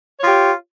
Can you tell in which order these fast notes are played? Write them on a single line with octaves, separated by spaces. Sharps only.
C#5 F4 G4